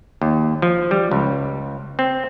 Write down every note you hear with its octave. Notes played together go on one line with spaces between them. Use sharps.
D#2
F3
G3
C#2
C4